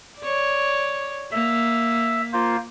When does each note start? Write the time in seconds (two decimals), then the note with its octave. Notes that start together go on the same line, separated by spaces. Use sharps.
0.19 C#5 D5
1.32 A#3 E5
2.33 A#3 F4 C5